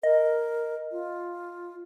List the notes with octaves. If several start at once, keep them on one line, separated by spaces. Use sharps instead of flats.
A#4 D#5
F4